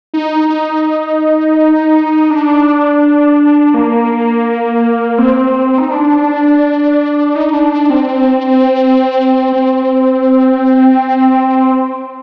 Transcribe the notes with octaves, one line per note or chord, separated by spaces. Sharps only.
D#4
D#4
D4
A#3
C4
D#4
D4
D#4
D4
D4
C4
C4